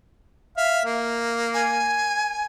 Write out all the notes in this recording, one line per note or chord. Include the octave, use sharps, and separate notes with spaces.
E5 F5
A#3
G#5